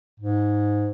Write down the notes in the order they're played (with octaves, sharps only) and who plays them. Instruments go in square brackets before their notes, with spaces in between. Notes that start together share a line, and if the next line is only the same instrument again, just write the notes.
[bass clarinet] G#2